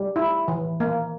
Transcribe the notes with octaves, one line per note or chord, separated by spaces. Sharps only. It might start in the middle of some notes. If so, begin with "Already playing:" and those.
Already playing: G3
E4
E3
A#3